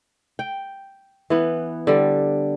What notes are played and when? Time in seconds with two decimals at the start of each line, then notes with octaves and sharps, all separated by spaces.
0.39 G5
1.30 E3 B3
1.87 D3 G3